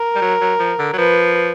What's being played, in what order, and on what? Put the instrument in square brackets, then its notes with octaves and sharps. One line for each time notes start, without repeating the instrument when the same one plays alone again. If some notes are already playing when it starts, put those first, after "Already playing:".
Already playing: [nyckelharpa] A#4
[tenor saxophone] G3
F#3
F#3
F3
D3
F#3
[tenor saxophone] F3 [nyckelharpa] B4